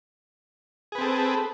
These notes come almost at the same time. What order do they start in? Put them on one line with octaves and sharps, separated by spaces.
G#4 B4 C4 A4